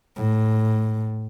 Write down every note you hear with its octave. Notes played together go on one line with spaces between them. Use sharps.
A2